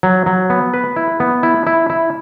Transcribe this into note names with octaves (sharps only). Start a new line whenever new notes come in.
F#3
F#3
B3
B4
E4
B3
E4
E4
E4